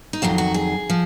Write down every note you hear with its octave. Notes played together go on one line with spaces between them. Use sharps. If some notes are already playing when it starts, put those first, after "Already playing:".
D#4
F2 D#3 F#3 F4
F#4
G#4
F3